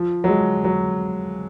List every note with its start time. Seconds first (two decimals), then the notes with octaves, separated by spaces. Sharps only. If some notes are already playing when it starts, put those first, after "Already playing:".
Already playing: F3
0.24 F#3
0.28 G#3
0.64 F#3